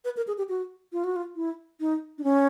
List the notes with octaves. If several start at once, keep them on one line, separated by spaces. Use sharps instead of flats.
B4
A#4
G#4
G4
F#4
F4
F#4
F4
E4
D#4
D4
C#4